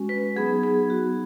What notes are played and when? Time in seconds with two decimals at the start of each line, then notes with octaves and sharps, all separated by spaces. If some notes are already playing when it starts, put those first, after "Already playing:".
Already playing: G#3 C#4 F#4
0.09 B4
0.36 F#3 B3 D#4 G#4
0.63 G#4
0.90 F#4